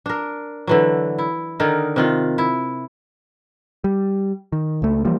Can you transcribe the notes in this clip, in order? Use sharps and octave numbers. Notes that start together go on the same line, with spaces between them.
D4 A#4
D3 E3 F#3
E4
D3 D#3 D#4 A#4
C3 D#3 F4
E4
G3
D#3
C#2 A3
E3 F3 G3 A#3